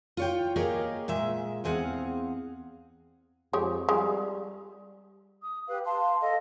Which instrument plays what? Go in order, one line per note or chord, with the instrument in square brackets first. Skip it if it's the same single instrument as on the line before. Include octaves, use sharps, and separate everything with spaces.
[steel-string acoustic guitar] F4 C#5 G5
A#3 G4 G#4 C#5 D#5 F5
A#2 G#3 E5
E2 C4 G#4 F5 F#5
[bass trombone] F2 [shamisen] G#3 G4 C#5
[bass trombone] G3 [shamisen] G#3
[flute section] D#6
G4 B4 F5
F5 A5 C6
A4 D#5 F5